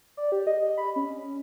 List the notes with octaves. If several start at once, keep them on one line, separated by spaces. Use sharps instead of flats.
D5
G4
D#5
B5
C#4